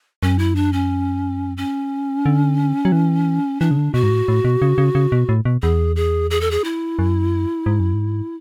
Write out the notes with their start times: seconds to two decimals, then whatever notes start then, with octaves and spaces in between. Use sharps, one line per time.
0.23 F#2 C#4
0.39 E4
0.56 D4
0.73 C#4
1.57 C#4
2.26 D3
2.85 F#3
2.92 E3
3.61 E3 D4
3.71 C#3
3.77 D3
3.94 B2 F#4
4.03 G#2
4.10 A2
4.28 A2
4.45 B2
4.62 C#3
4.78 C#3
4.95 C#3
5.12 B2
5.29 A2
5.45 B2
5.62 E2 G#4
5.96 G#4
6.31 G#4
6.41 A4
6.51 G#4
6.64 E4
6.99 F#2
7.66 G#2
7.80 F#2
7.94 G#2